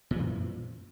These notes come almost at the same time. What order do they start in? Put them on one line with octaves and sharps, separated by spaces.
A#2 F3 E3 F#2